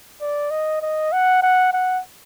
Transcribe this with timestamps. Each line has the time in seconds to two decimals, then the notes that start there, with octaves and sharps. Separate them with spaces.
0.21 D5
0.51 D#5
0.82 D#5
1.12 F#5
1.42 F#5
1.73 F#5